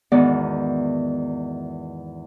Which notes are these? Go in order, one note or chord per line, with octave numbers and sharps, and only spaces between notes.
E2 G#2 D#3 B3 F#4 D5